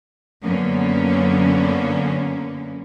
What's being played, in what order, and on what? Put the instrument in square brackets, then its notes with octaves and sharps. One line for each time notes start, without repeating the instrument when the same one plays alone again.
[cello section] F#2 D3 A#3 B3 C#4